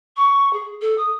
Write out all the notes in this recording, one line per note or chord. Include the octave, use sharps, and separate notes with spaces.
C#6
G#4
A4
D#6